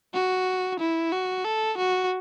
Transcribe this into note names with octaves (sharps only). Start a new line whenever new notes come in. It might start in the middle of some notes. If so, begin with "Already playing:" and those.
F#4
E4
F#4
A4
F#4